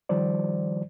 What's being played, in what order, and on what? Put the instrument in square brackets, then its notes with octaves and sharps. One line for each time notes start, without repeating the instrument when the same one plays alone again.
[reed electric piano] D#3 F3 G3 C5 D5